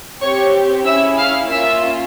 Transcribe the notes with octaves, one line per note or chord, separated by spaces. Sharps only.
C4 G4 C#5 C#6
C#4 E4 G#4 E5 E6
F5 F6
A#3 C#4 F4 E5 E6